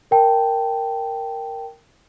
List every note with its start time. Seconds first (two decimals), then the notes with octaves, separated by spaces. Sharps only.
0.11 A#4 G5 A5